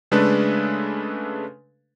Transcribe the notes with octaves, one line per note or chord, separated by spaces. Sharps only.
C#3 G#3 A3 D4 A4 B4